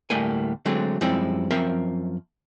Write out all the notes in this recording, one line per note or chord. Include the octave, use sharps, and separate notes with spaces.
D2 A2 G3 A3 A#3 G#5
D3 F#3 G#3 A3 C4
F#2 F3 G3 G#3 C4 E4
F#2 F3 C4 A#4 E5